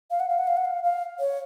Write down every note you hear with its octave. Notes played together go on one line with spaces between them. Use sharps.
F5
F#5
F5
F#5
F5
F#5
F5
F5
C#5